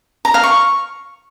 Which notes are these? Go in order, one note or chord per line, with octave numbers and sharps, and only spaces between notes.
A#5
F5
C#6